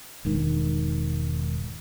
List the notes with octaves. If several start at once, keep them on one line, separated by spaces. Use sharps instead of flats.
E1 G#2 D#3